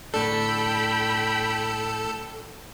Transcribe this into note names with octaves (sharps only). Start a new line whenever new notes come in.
A2 D4 A4 G5 B5